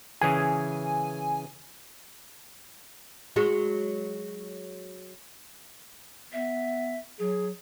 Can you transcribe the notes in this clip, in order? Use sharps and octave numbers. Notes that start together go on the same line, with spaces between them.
C#3 E3 G#4 G#5
F#3 G#3 F#4
B3 E5
F#3 G#4